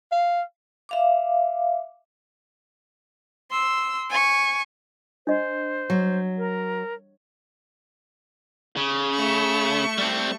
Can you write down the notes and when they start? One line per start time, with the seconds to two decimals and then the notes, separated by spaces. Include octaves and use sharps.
0.12 F5
0.89 E5 F5 D6
3.51 C6 E6
4.10 G#5 C#6
5.27 D4 C5 D#5
5.90 F#3
6.38 A#4
8.77 C#3
9.14 A3 C#6
9.98 G3 C4